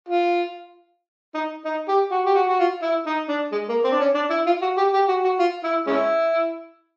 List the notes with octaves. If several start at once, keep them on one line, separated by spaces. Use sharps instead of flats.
F4
D#4
D#4
G4
F#4
G4
F#4
F#4
F4
E4
D#4
D4
G#3
A#3
C4
D4
C#4
D4
E4
F4
F#4
G4
G4
F#4
F#4
F4
E4
G#3 C#4 E4